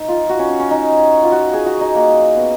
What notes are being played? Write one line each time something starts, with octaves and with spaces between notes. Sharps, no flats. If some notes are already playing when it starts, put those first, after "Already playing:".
Already playing: D#4
F4
F#4
C#4
C#4
C#4
D#4
F4
F#4
G#4
F#4
D#4
A#3
B3